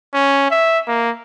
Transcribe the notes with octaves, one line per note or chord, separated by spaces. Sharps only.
C#4
E5
A#3